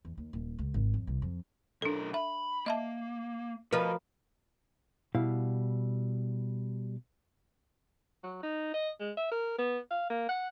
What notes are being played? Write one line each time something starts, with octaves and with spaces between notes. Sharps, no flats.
E2
D#2
D#1
C#2
G#1
F2
C2
F2
B1 D4 A4 A#4
E5 B5
A#3 D#5 E5 A5
F3 F#4 A#4 B4 D#5
B2 G3 E4 F5
F#3
D#4
D#5
G#3
E5
A#4
B3
F5
A#3
F#5